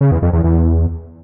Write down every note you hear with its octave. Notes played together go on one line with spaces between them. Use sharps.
C#3
E2
F2
E2
E2